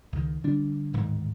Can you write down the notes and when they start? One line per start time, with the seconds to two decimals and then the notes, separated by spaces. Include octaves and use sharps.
0.12 C#2 D#3
0.44 D3 G3 D4
0.93 D1 G#2 D#3